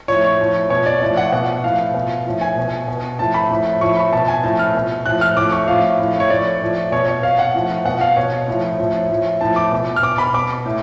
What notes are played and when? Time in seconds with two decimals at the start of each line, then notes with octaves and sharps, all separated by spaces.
0.08 A2 F3 C#5
0.24 C#5
0.39 A2 F3
0.70 B2 C#5
0.86 D5
1.02 A2 F3 D5
1.17 F#5
1.32 B2 F#5
1.64 A2 F3 F5
1.94 B2
2.26 A2 F3
2.41 G#5
2.57 B2
2.88 B2
3.19 A2 F3 A5
3.34 B5
3.51 A2 F3
3.81 A2 F3 C#6
3.97 B5
4.13 B2 A5
4.28 G#5
4.43 A2 F3 A5
4.59 F6
4.75 B2
5.06 A2 F3 F#6
5.21 F6
5.37 A2 F3 D6
5.52 C#6
5.68 A2 F3 F5
5.99 A2 F3
6.20 C#5
6.30 A2 F3 D5
6.61 A2 F3
6.92 B2 C#5
7.08 C#5
7.23 B2 F5
7.39 F#5
7.54 A2 F3
7.85 B2 F#5
8.01 F5
8.16 B2 C#5
8.48 A2 F3
8.79 A2 F3
9.10 A2 F3
9.41 A2 F3 A5
9.56 D6
9.72 B2
9.96 F6
10.03 B2 D6
10.18 B5
10.34 B2 D6
10.65 A2